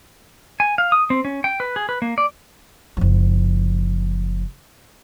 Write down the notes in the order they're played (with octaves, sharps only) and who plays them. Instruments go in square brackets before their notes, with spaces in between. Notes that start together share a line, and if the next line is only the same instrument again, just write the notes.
[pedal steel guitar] G#5
F5
D#6
C4
C#4
G5
B4
G#4
B4
A#3
D5
[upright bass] F#1 F3